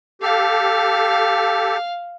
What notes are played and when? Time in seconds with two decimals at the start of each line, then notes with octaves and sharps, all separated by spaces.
0.22 G4 A4 F5